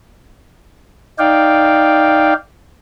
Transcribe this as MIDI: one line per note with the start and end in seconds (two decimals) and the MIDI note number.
1.19 2.34 63
1.19 2.34 74
1.19 2.34 77
1.19 2.34 79